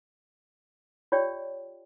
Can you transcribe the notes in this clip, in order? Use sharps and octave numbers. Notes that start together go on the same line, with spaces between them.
F4 G4 C#5 D5 G5